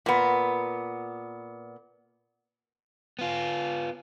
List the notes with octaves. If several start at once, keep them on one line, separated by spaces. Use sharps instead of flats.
A#2 B3
B3 F4